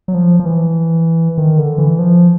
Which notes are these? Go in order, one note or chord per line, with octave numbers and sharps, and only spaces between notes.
F#3
F3
F3
E3
D#3
D3
E3
F3